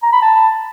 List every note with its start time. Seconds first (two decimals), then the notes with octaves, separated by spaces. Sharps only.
0.03 A#5
0.13 B5
0.22 A5